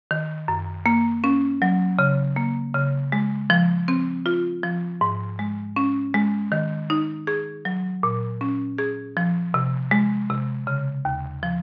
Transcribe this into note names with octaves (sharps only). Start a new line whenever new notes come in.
D#3
F#2
A#3
C#4
F#3
C#3
A#3
C#3
G#3
F3
C4
F4
F3
G#2
G#3
C#4
G#3
D#3
D#4
G#4
F#3
A#2
C#4
G#4
F3
C3
G#3
C3
C#3
D#2
F3